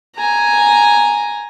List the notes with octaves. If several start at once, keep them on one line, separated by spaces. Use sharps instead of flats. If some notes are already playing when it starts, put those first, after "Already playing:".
G#5 A#5